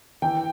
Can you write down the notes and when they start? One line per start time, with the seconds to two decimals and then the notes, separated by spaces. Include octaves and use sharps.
0.22 E3 G5